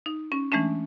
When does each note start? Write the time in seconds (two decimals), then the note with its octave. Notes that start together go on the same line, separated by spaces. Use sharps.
0.06 D#4
0.32 C#4
0.52 E3 G#3 A3 C#4 D4